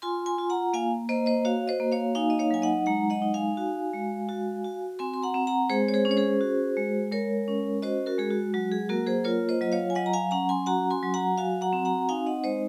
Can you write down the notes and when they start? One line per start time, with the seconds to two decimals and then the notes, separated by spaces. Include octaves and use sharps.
0.02 F4 G#5 C6
0.26 G#5 C6
0.38 F4
0.50 F#5 A#5
0.73 A#3 F5 G#5
1.09 A#3 C5 D#5
1.26 C5 D#5
1.45 F#4 C#5 F5
1.68 C5 D#5
1.80 A#3
1.92 C#5 F5
2.15 D#4 F5 G#5
2.30 D#5
2.39 C#5 F5
2.51 F#3 G#5
2.62 D#5 F#5
2.86 G#3 F#5 A#5
3.10 D#5 F#5
3.22 D#4
3.34 F5 G#5
3.57 F#4
3.93 G#3
4.29 F#4
4.64 F#4
4.99 C4 G#5 C6
5.14 C6
5.23 F#5 A#5
5.34 C4
5.47 F#5 A#5
5.70 G#3 G#4 C5
5.89 C#5
5.94 G#4 C5
6.05 C#4
6.11 C#5
6.17 G#4 C5
6.41 F#4
6.77 G#3
7.12 G#3 A#4 C#5
7.48 C#4
7.82 F#4 C5 D#5
8.06 F#4 A#4
8.18 G#3 G#4
8.30 F#4
8.54 F#3 F#4
8.72 G#4
8.89 A#3 F#4 A#4
9.07 G#4 C5
9.24 F4 A#4 C#5
9.49 C5 D#5
9.61 F#3 D#5
9.72 C#5 F5
9.90 G#5
9.95 F#3 D#5 F#5
10.06 A#5
10.13 F5 G#5
10.31 C#4 F#5 A#5
10.49 G#5 C6
10.66 F#4 F#5 A#5
10.90 G#5 C6
11.03 F#3
11.14 F#5 A#5
11.38 F#4 F5 G#5
11.61 F#5 A#5
11.73 C4
11.85 F#5 A#5
12.09 D#4 F5 G#5
12.27 D#5 F#5
12.44 G#3 C5 D#5